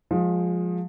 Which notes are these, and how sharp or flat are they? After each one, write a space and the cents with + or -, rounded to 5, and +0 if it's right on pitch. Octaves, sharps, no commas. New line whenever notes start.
F3 +25 G#3 +5